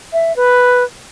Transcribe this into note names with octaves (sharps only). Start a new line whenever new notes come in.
E5
B4